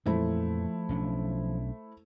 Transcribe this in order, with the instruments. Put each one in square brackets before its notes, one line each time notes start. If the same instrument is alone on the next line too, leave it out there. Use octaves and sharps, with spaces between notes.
[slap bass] F2 A#2 E3 [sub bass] F3 [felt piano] A3 E4 C5
[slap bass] B1 C#4 D4